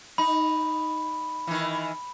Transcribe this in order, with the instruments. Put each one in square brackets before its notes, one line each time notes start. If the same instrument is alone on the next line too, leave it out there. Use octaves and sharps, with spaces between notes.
[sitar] D#4 [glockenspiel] B5
[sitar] D#3 E3